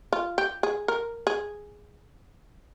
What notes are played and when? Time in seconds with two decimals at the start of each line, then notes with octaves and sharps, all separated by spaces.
0.13 F4
0.38 G4
0.63 G#4
0.88 A#4
1.27 G#4